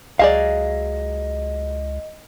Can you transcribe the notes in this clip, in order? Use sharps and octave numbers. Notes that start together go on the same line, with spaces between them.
C#2 F#3 G#4 D5 D#5 F5